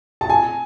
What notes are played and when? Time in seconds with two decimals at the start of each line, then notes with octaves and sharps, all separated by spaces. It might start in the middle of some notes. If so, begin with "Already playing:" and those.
0.21 A5
0.30 G#5